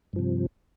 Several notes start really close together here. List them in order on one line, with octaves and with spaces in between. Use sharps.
G2 F3 C3